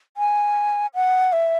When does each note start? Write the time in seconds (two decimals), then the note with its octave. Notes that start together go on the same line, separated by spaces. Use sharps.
0.17 G#5
0.95 F#5
1.33 E5